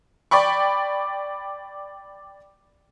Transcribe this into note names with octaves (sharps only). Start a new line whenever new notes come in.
D5 G5 B5 C#6